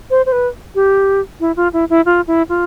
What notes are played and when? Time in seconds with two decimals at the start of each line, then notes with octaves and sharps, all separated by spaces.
0.10 C5
0.26 C5
0.32 B4
0.75 G4
1.40 E4
1.56 F4
1.73 E4
1.90 E4
2.06 F4
2.27 E4
2.49 F4